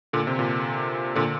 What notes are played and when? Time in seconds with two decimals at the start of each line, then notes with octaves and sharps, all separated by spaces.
0.13 A#2 D3
0.27 C3
0.39 A#2
1.15 A#2 D3